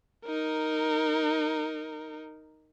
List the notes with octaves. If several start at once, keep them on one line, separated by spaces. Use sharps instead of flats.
D#4 A#4